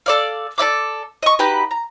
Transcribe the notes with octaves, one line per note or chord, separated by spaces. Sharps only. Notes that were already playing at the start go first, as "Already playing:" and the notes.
A4 D5 F5
A4 D5 E5 D6
D#5 C#6
D#4 F#4 G4 B4
A#5